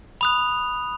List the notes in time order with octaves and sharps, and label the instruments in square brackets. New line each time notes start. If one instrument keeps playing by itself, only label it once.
[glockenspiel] B5 D#6 F#6 F7